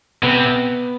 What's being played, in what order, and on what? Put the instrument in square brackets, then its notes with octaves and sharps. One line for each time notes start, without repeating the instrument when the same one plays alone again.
[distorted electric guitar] C3 [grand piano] B3